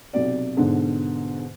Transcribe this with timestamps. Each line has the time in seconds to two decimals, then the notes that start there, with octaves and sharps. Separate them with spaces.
0.13 B1 C3 D5
0.57 G#2 B2 D3